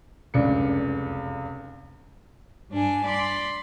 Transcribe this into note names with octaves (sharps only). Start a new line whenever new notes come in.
F1 C#2 F#2 D4 D5 C#7
G2 D4 G#5
D5 B5 C6